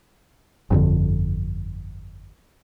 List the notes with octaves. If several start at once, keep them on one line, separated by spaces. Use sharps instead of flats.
G1 F2 D3